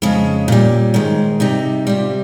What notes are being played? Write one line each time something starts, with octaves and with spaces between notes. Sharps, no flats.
F2 C#3 G#3 C#4
A#2 G3
G#2 D#3 G#3
C3 G3 D#4
C3 G3 F4